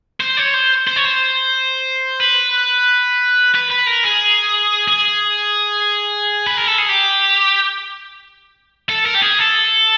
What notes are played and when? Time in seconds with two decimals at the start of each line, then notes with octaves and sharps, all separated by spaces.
0.20 C5
0.37 C#5
0.54 C5
0.87 C5
0.96 C#5
1.05 C5
2.20 B4
3.55 B4
3.71 B4
3.87 A#4
4.04 G#4
4.88 G#4
6.47 B4
6.57 A#4
6.68 A4
6.78 G#4
6.89 G4
8.89 A4
9.05 A#4
9.15 G4
9.22 G#4
9.39 A4